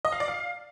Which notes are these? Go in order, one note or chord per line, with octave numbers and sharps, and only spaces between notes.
D#5
F5
D5
F5